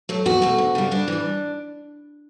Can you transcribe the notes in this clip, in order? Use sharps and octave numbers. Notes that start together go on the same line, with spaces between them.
F#3 A3
E2 F#4
B2 A3
D2
C#3 G3
G2 D4
E3 G3